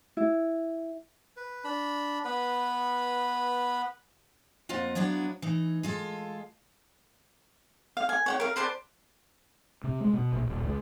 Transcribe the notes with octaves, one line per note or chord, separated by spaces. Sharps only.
E4
B4
D4 B5
B3 B4 B5
F2 A#3 F4 F#5
F3 F#3 B3 D4 E4
E3 D#4
G#3 F4 A4
F5
G#5
C#5 F#5 G5
A#4 F5
B4 C5 D5 A5
C3
G#3
B2
A#1
D#1
C#2